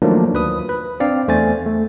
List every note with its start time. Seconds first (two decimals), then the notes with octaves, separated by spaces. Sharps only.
0.02 D#3 F3 F#3 A3 A#3 D4
0.34 D2 B4 D#6
0.69 B4
1.00 C4 D4 D5 F5
1.28 E2 A3 C5 G#5 A6
1.66 A3